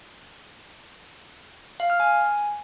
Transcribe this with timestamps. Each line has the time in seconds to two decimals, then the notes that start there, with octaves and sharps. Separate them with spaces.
1.80 F5
1.90 F6
2.00 G#5